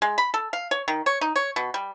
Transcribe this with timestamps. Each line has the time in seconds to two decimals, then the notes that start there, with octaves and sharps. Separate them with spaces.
0.02 G#3
0.18 B5
0.34 A4
0.53 F5
0.71 C#5
0.88 D#3
1.06 C#5
1.21 D#4
1.36 C#5
1.56 B2
1.74 G3